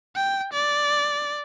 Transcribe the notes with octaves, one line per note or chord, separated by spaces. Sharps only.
G5
D5